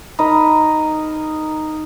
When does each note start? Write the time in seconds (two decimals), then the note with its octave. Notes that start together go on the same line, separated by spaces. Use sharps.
0.19 D#4 A#4 D#5 B5